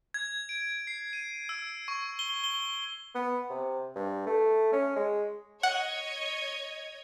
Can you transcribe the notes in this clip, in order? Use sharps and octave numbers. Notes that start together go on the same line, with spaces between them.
G#6
D7
C7
D#7
E6
C#6
G7
G7
B3
C3
G2
A3
C#4
G#3
C#5 D#5 F#5 G#6